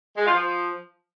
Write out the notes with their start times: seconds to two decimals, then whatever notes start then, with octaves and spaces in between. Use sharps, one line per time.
0.17 G#3
0.25 F4
0.34 F3